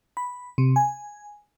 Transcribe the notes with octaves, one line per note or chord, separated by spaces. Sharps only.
B5
C3
G#5